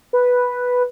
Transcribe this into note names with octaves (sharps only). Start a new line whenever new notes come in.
B4